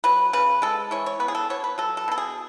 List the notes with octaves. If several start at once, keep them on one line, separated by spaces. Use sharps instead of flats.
F#3 B4
C#3 B4
G#3 A4
E3 C#5
C#5
B3 B4
G#4
A4
B3 C#5
B4
F#3 A4
A4
B2 A4
G#4